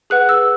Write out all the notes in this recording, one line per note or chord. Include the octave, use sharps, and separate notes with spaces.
G#4 B4 F#5 F#6
E6